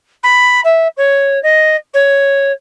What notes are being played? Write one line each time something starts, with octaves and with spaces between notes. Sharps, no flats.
B5
E5
C#5
D#5
C#5